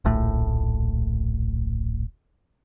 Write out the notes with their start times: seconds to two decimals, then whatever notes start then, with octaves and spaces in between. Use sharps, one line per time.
0.05 D1 A#1 A2 A3